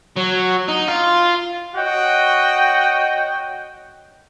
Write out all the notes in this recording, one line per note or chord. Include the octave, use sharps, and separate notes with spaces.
F#3
D#4
F4
F#4 C#5 D#5 F#5 G5